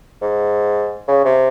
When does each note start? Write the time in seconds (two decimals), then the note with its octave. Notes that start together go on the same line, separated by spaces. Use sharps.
0.22 G#2
1.08 C#3
1.25 C3